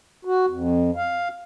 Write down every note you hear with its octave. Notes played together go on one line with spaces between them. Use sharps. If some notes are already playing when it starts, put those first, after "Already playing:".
F#4
F2
F5